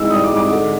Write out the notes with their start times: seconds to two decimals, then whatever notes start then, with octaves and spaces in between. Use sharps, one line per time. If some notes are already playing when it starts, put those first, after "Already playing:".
Already playing: G#2 E3 E6
0.10 G3 D#6
0.24 D6
0.31 G#2
0.36 D6
0.50 D3